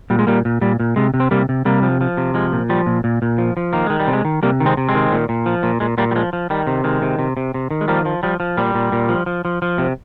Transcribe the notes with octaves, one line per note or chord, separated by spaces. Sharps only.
A#2 G3
G#3
A#2 G3 A#3
A#2
A#2 G3
A#2
C3 G#3
C3
C4
C3 G3 A#3
C3
C3 G3 A#3
F3
F3
C3
F3 G#3
A#2
F3 G3
A#2
A#2
A#2
F3
F3
D#3 A#3
D#3 G#3
G3
C3
G#3
D#3
C3 G3 A#3
D#3
G#3 C4
C3
G#3 C4
D#3
A#2
A#2
F3
A#2
A#2 G#3
A#2 G3 A#3
G3
F3 G#3
F3
D#3 G3
C3
D#3 G#3
C3
C3
C3
C3
D#3
G#3
F3 G3 A#3
F3
F3 G3
F3
A#2 G3
A#2
A#2
F3
F3
F3
F3
C3